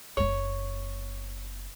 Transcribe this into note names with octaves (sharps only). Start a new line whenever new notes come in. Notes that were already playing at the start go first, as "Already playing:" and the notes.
F#1 B3 C#5